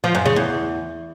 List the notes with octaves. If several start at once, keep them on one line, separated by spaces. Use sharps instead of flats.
F3
F#2
C#3
E2